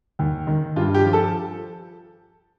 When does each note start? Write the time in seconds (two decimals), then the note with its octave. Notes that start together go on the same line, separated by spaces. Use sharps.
0.19 D#2
0.47 D#3
0.76 G2 F4
0.94 G4
1.04 F3
1.13 A4